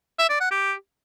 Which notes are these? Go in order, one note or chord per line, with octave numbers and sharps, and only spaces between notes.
E5
D5
F#5
G4